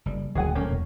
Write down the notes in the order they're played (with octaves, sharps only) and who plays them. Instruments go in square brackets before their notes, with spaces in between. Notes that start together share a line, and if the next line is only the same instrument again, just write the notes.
[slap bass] F#1 G3
[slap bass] D#1 [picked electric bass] D2 F3 F#3 [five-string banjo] G#4 F#5 G#5
[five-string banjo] A3 A#3 C#4
[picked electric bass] E1